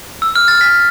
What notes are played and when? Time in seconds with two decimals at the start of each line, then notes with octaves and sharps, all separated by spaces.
0.22 E6
0.35 F6
0.48 A6
0.61 B6